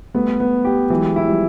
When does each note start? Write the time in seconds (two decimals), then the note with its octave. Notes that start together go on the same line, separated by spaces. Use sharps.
0.14 G3 A3 B3
0.40 B3
0.65 G4
0.90 E3 F#3 G#3
1.16 E4
1.28 F3 G3